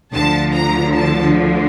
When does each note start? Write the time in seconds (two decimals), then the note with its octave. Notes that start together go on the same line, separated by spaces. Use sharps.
0.13 D2 D3 F3 A5
0.54 A#5
0.95 A5